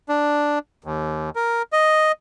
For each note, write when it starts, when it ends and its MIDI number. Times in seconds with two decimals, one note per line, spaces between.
0.09 0.59 62
0.84 1.30 39
1.36 1.62 70
1.73 2.12 75